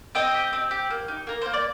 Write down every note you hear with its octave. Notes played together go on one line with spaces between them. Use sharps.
C4 D#5 G5
G4
C4
G4
A#3
D#4
A#3 A#4
A#3 C5
D5